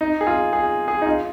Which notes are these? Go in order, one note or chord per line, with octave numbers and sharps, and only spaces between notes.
D#4
G#4
F4
G#4
G#4
D#4
F4